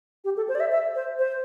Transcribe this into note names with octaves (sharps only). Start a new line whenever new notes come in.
G4
A4
C5
D5
E5
E5
C5
C5